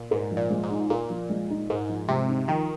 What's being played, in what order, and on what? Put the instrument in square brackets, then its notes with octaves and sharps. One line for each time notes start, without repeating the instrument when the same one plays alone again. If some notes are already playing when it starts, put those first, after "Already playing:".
Already playing: [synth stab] A#2
[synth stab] G#2 [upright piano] A#4
[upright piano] F3
[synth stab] A#2
[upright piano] G#3
[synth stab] G#2
[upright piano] D#4
[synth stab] A#2 [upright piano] A#4
[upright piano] F3
G#3
D#4
[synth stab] G#2 [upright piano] A#4
[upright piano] F3
[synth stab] C3 [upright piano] G#3
[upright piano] D#4
[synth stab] D#3 [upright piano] F3